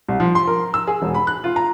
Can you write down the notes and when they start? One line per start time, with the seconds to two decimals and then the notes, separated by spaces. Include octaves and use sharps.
0.08 C2
0.20 F3
0.35 C6
0.47 A#4
0.74 E6
0.87 G#4
1.02 E1
1.14 B5
1.27 F#6
1.44 F4
1.56 A#5